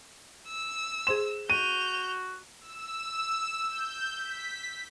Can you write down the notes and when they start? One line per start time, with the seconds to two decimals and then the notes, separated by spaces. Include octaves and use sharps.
0.49 E6
1.07 G#4 C5 C6 E7
1.50 F#4 G6 D#7 F7
2.61 E6
3.69 G6
4.18 B6